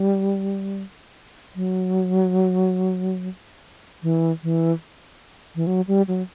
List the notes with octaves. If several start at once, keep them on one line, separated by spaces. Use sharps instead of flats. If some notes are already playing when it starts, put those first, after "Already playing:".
Already playing: G3
F#3
E3
E3
E3
F#3
G3
F#3